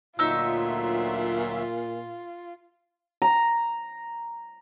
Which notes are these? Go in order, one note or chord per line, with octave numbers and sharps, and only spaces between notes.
D2 A#2 F#3 D#4 F4 E5 E6
A#5